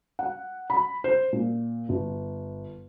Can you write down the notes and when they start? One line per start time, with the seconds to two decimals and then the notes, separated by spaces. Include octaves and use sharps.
0.19 F#5
0.70 B5
1.04 C5
1.33 A#2
1.89 G1